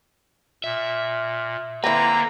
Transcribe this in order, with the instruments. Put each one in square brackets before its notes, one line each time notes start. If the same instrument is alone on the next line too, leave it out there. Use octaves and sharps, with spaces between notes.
[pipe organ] A#2 [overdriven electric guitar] E5
[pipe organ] D3 A#3 [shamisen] C4 E4 [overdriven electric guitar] B4 [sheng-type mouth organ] A#5